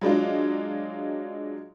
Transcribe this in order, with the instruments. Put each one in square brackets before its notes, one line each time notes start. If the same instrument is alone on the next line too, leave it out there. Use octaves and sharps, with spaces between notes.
[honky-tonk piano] F#3 G#3 D4 F4